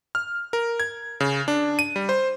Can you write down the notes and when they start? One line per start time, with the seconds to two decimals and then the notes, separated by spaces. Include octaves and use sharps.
0.15 F6
0.53 A#4
0.80 G#6
1.20 C#3
1.48 D4
1.79 D#7
1.96 G3
2.09 C5